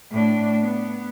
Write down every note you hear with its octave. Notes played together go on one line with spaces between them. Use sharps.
A2 D4
B3